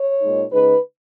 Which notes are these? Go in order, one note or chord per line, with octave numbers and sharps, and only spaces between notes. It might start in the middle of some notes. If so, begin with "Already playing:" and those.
Already playing: C#5
A#2 G#3 D#4
C#3 G#3 D#4 B4